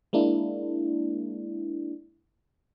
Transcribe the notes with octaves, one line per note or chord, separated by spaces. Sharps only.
G#3 A#3 D4 E4